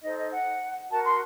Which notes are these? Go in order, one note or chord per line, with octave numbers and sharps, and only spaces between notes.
D#4 A4 C5 D#5
D#5
F#5
F#4 A#4 A5
C6